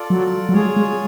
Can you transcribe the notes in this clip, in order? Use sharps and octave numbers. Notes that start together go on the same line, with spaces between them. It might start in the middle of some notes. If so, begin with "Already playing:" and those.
Already playing: F4 A4 D5
F#3
F#3
G#3 F4 G#4 C#5
G#3